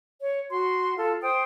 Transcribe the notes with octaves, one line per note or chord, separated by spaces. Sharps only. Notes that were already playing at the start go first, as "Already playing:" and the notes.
C#5
F#4 C6
F4 A4
C5 G5 D#6